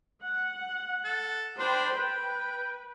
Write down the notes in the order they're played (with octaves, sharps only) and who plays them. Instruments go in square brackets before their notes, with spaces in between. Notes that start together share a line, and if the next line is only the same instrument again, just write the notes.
[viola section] F#5
[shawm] A4
[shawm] D4 [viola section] C5 G5 B5
[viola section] B4 [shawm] G5